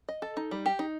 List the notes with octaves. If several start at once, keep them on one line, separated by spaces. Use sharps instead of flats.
D#5
A4
D#4
G3
G4
D#4